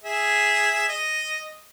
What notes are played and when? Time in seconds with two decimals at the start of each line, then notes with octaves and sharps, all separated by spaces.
0.04 G#4 E5
0.89 D#5